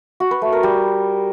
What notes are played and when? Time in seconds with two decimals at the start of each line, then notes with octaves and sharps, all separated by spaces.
0.20 F#4
0.31 B4
0.42 A3
0.52 A#4
0.63 G3